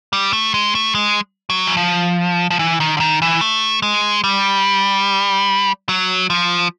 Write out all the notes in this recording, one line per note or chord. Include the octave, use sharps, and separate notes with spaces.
G3
A3
G#3
A3
G#3
F#3
E3
F3
F3
E3
D#3
D3
D#3
E3
A3
G#3
G3
F#3
F3